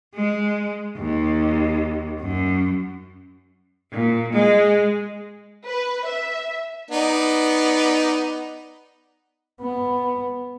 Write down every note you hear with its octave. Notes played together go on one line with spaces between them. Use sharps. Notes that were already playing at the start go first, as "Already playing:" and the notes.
G#3
D#2
F#2
A#2
G#3
B4
E5
B3 D#4 D5
B3